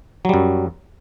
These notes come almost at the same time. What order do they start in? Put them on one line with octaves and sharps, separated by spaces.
F#3 G3 F#2